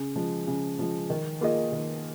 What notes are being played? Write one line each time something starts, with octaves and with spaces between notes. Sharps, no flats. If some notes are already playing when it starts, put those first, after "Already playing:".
Already playing: C#3
F3 G#3
C#3
F3 G#3
D#3
A#3 F4 G#4 D#5
D#3